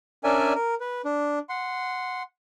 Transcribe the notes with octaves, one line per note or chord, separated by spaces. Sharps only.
C#4 D4 A#4 D5 E5 G#5
A#4
B4
D4
F#5 C6